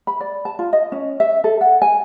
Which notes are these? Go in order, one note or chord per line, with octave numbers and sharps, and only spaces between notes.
B5
D5
A5
F4
D#5
C#4
E5
A4
F#5
G#5